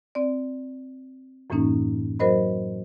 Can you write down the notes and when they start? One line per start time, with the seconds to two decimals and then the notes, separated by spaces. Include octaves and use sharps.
0.15 C4 D5
1.50 F#2 A2 E3 A#3 C#4 D#4
2.19 F#3 F#4 A#4 C5 D#5 B5